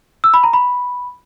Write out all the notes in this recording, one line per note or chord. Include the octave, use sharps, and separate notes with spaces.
E6
B5
A#5
B5